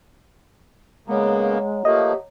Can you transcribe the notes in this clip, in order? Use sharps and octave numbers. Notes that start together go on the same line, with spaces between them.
C#3 G#3 A#3 B3 C#5 F#5 A#5
F3 A3 A#3 G4 D#5